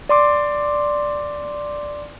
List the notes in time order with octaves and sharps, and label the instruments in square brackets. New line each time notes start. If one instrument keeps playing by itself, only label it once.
[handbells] D5 C6 D6